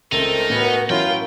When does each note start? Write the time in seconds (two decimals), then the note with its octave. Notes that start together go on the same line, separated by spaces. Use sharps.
0.12 C#2 A3 C4 D#4 A#4
0.50 A2 B3 C#4 F#4
0.90 F#3 C#4 E4 F4 G5